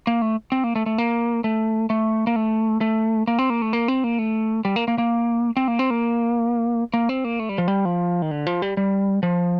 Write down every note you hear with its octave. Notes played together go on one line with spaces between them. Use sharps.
A#3
A3
C4
A#3
A3
A3
A#3
A3
A3
A#3
A3
A3
A#3
C4
A#3
A3
A#3
C4
A#3
A3
G3
A#3
A#3
A#3
C4
A#3
C4
A#3
A#3
C4
A#3
A3
G3
F3
G3
F3
D#3
D3
F3
G3
G3
F3